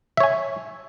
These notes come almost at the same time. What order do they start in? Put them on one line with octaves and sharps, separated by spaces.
E5 C#5 G#5